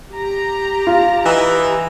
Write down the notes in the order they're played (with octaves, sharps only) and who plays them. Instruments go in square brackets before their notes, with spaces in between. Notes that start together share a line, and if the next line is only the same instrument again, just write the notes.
[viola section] G4 A#5
[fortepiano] F4
[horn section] E3 D#4